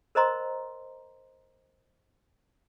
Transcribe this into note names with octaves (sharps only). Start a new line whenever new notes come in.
A#4 C5 D#5 A#5 C6